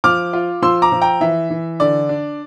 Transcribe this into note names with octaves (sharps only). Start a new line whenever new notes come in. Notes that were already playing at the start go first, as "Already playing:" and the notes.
F3 D6 F6
F4
F3 C6 E6
A#5 D6
F3
G5 A#5
E3 E5
E3
D3 D5
D4